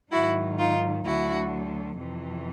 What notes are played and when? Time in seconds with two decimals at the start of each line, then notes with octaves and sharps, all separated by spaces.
0.12 G#2 D#3 F#3 E4 F#4
0.59 D#4 F4
1.05 D2 D3 F#3 E4 F#4
1.98 F2 C3 E3